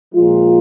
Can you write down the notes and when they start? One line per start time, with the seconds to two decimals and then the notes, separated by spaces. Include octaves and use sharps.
0.14 A#2 F3 G#3 F4